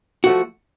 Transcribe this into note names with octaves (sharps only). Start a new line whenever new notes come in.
F3 A3 F#4